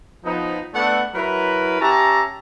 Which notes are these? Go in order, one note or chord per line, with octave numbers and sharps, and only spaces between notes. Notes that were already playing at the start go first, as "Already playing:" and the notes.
F3 B3 D#4
A3 B3 D4 A4 D5 F#5
F#3 E4 A#4 B4
C#4 G4 E5 A5 A#5